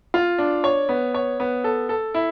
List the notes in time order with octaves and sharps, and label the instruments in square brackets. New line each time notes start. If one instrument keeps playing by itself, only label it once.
[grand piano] F4
D4
C#5
B3
C#5
B3
A4
A4
E4